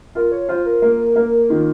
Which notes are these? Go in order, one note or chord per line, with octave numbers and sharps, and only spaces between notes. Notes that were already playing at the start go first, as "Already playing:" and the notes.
F4 A#4
C#5
F4 C5
A#4
A#3
A#3
D#3 F4